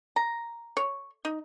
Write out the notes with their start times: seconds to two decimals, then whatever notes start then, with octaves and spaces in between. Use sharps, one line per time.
0.16 A#5
0.77 C#5
1.25 D#4